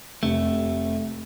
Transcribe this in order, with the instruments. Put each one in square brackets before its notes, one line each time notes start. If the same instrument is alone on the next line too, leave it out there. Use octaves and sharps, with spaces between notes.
[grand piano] F1 C3 C#7 [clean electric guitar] A3